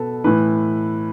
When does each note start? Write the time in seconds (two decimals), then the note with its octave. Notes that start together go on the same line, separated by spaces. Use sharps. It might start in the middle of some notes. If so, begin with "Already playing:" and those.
Already playing: B2 A4 B4
0.24 A2 E3 B4